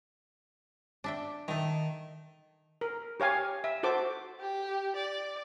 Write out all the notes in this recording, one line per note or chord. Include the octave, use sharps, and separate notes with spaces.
D4 E5 G5
D#3 A3 D#4
A#4
G4 C#5 F5 G#5
E5
F#4 A4 C5 D6
G4
D5